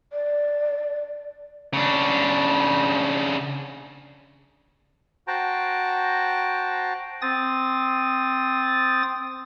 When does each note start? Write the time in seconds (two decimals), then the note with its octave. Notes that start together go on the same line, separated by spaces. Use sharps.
0.13 D5
1.73 C#3 D4
5.28 F#4 C5 G5 A5 A#5
7.22 C4 D#6 A6